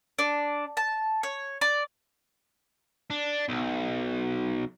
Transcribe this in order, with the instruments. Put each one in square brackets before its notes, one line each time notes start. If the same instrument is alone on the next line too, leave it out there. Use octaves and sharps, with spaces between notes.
[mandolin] D4
A5
C#5
D5
[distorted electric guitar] D4
B1